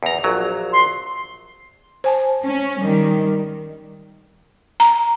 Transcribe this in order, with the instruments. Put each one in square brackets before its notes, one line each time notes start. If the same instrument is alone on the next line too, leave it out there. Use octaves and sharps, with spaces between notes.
[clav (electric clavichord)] E2 A#5
A#1 F#3
[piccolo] C6
[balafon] C5 G#5 A5
[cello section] C#4
D#3 G3
[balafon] A#5